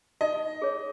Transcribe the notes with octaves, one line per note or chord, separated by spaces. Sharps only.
D#4 D#5
G#4 C#5